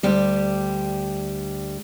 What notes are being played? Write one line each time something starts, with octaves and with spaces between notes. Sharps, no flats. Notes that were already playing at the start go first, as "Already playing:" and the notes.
D2 G3 G4